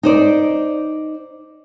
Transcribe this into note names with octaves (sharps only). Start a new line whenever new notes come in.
D#4 C5 D5